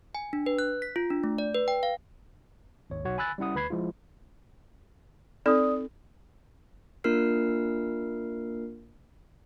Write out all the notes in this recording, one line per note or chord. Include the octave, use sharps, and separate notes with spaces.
G#5
D4
B4
F#6
B6
F4
D4
A3
D5
B4
G5
F5
G#1 D#2 C#5
B1 F#4 C#5 F#5
G#5 B5 E6 F#6 A6
G3 C#4 E4 F#5 D#6
D2 B4 B5 G#6 C7
F3 G#3 E4 F4
C4 D#4 A4 D5 D#6
A#3 D4 F4 A#4 F6 C7